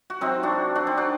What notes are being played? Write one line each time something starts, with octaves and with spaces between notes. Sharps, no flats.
F#4
C3 F#3 C4 D#4
D4 F#4
D4 F#4
C4 D#4
D4 F#4